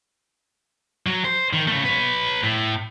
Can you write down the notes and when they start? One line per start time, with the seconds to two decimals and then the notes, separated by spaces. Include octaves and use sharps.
1.06 F#3
1.25 C5
1.53 D#3
1.68 C#3 A3
1.85 B4 C#5
2.43 A2